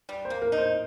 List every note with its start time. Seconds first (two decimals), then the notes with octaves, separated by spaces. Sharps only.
0.09 G3
0.25 C5
0.30 A#3
0.42 A#4
0.52 D#4
0.58 C5